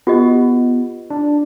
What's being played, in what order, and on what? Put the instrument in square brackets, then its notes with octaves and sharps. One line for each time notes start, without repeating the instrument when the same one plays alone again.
[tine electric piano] B3 [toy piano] F4 G4 D#5
[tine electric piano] D4